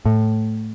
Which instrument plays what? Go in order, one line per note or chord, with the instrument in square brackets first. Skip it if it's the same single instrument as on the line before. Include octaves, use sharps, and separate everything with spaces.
[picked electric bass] A2